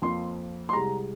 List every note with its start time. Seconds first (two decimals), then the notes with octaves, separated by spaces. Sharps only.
0.02 F2 F3 A#3 C6
0.69 C6
0.73 C2 C3 G#3 A#5